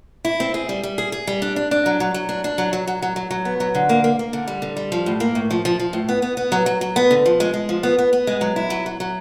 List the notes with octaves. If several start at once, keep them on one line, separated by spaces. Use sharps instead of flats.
E4
C4
G#4
G3
G3
G#4
G#4
G3
D4
D4
D4
F#3
F#3
F#3
D4
D4
F#3
F#3
F#3
F#3
F#3
F#3
B3
F#3
D3
A#3
A#3
A#3
D3
G3
D3
G3
F3
A2
A#3
A2
F3
F3
F3
A2
B3
B3
B3
F#3
F#3
F#3
B3
D3
F3
G#3
G#3
F3
B3
B3
B3
G#3
F#3
E4
F#3
F#3
F#3